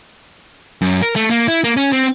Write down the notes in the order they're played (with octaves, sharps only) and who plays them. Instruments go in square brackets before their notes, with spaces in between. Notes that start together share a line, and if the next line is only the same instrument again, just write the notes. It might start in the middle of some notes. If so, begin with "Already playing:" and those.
[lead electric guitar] F#2
A#4
A3
A#3
E4
A#3
C#4
C4